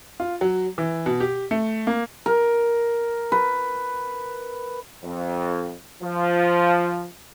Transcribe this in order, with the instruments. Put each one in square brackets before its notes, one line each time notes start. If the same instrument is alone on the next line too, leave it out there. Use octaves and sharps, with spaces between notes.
[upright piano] F4
F#3
E3
B2
G4
A3
A#3
[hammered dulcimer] A#4
B4
[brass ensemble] F2
F3